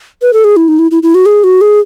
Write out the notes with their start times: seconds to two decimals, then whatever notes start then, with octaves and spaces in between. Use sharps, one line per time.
0.22 B4
0.33 A4
0.44 G#4
0.56 E4
0.68 D#4
0.79 E4
0.91 E4
1.03 E4
1.15 F#4
1.26 G#4
1.44 F#4
1.61 G#4